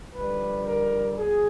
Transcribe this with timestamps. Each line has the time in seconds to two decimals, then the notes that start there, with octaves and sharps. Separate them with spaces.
0.14 F2 D3 G3 B4
0.65 A#4
1.17 A#2 F#3 G#4